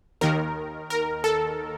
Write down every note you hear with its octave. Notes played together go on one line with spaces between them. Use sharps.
D#2 D#3 A#4
A#4
A4